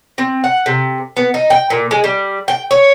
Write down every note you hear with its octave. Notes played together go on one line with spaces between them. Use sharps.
C4
F#5
C3
B3
D#4
G5
A#2
G#3
G3
G5
C#5